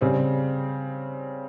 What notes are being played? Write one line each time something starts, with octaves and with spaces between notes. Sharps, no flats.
C#3 G3 C4